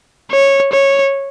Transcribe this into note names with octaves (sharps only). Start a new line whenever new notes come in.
C#5
C#5